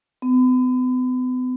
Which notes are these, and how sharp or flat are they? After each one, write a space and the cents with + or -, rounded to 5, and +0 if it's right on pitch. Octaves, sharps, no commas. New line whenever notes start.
B3 +40